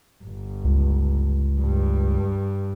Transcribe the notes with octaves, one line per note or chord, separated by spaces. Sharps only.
G1
C#2
G2